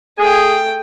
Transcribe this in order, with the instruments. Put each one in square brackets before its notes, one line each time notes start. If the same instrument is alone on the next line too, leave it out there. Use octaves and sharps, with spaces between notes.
[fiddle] A3 G5 [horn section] G#4